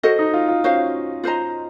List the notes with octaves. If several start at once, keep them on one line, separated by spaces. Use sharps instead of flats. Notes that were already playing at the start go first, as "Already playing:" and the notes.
F#4 A4 C5 D#5
D#4
F4
F4
C#4 F#4 C5 F5
F4 C5 D#5 A#5